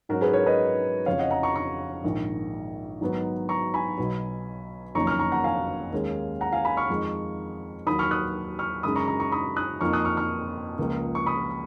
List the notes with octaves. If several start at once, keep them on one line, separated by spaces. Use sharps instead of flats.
G#2 F#3 C#4 F#4 A#4
G#4 B4
A#4 C#5
B4 D#5
F1 F2 C#3 C#5 F5
D#5 F#5
F#5 A#5
A#5 C#6
A#5 C#6
A#1 G#2 D#3
G#2 D#3 F#3 B3 D#4
A#5 C#6
G#5 B5
B1 B2 F#3
F#1 F2 D#3 A#3 C#4 A#5 C#6
C#6 F6
A#5 C#6
F#5 A#5
F5 G#5
D#2 D#3 G#3 C#4
F#5 A#5
F5 G#5
G#5 B5
C#6 F6
F2 D#3 G#3 D#4
D#2 D#3 F#3 B5 D#6
C#6 F6
D#6 F#6
C#6 F6
F#2 C#3 G#3 D#4 B5 D#6
A#5 C#6
A#5 C#6
A#5 C#6
B5 D#6
D#6 F#6
F2 F3 A#3 D#4 C#6 F6
D#6 F#6
C#6 F6
C#6 F6
C#2 C#3 F3 A#3
C#6
B5 D#6